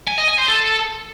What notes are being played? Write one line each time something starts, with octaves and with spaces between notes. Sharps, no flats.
G#5
D#5
G#5
C5
A4